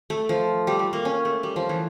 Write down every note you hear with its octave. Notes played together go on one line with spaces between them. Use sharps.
A3
F3
G3
A3
A#3
C#4
A3
G3
F3
E3